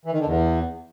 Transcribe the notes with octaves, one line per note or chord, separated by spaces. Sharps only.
E3
D#3
D3
E2